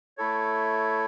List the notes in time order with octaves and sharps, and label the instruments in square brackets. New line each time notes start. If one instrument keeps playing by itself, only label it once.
[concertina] A3 E4 A4 C#5